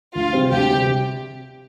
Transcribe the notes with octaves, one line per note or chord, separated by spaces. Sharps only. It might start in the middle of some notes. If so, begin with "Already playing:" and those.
D2 F4
C3 G3 C4
D2 G4
C3 G3 C4
C3